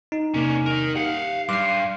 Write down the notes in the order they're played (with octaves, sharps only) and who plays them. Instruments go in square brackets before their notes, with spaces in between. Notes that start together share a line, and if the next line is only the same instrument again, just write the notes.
[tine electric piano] D#4
[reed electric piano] E2 C3 A#3 [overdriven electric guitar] C#4 D4
[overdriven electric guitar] A#4 D#5
[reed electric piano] G4 [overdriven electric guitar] F5 F#5
[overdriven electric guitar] G2 [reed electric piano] C6 F6 [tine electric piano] D6 C7